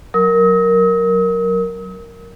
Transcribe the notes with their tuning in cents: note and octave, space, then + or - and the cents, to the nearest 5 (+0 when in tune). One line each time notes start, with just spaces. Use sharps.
F#3 +0 A#4 +0 D#6 +45